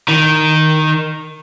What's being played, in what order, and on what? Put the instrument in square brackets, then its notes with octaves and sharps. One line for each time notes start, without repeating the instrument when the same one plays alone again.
[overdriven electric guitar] D#3